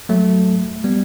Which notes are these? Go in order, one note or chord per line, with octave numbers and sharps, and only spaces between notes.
F#3 A3
G3 B3